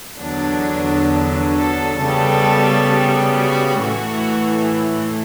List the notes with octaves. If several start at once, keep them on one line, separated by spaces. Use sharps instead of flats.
E2 D3 F#3 B3 D4
A4
C#3 G3 B3 A4
F#4
A2 E3 A3 F#4